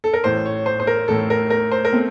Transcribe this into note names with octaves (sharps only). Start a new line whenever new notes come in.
A4
A#4
A1 A2 A3 C5
C#5
C5
C5
A#4
A1 A2 A3 A4
A#4
A#4
C5
A#4
A3 C4